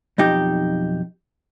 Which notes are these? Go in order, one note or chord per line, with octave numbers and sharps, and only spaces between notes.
B1 F2 D#4 G4